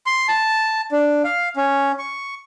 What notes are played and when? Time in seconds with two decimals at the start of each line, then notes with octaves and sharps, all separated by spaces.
0.07 C6
0.28 A5
0.92 D4
1.24 F5
1.56 C#4
1.99 C#6